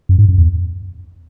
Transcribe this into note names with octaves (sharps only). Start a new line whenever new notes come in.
F#2
G#2
F#2
E2